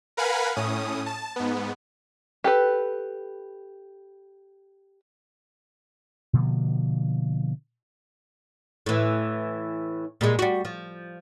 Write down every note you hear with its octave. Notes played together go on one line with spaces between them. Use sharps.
A#4 B4 F5 F#5 G#5 B5
A2 C#4 D#6
A5
G#2 B3
G4 A4 B4
B2 D3 F3 A#3
A2 E3
A#2 G3 G#3
G3 F#4
F3